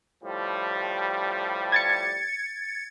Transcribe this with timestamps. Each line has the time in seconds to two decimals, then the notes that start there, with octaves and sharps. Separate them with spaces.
0.24 A2 F3 G3
1.72 G#6 A6 C#7